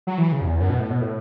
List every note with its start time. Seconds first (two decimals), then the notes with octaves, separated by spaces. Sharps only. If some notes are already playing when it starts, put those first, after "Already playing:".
0.07 F#3
0.18 E3
0.32 C#3
0.41 F#2
0.46 E2
0.60 F#2
0.70 B2
0.80 A2
0.90 B2
1.01 A2